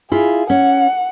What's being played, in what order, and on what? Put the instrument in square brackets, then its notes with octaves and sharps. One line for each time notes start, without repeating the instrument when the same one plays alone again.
[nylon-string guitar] E4 F4 [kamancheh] G#4
[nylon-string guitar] C#4 [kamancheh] F#5